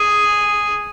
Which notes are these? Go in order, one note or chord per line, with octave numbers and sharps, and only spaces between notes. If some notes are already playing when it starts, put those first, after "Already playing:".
Already playing: G#4